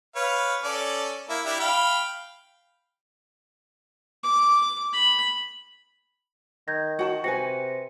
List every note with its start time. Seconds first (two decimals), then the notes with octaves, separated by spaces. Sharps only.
0.16 B4 C#5 F5
0.64 C#4 A4 D5
1.30 A#3 E4
1.45 D4 E4 G4
1.60 F5 G5 B5
4.24 D6
4.93 B5
6.68 D#3 G6 G#6 A#6
6.99 F#4 G5 A5
7.24 C3 F#4 B4 G5 G#5 A#6 C#7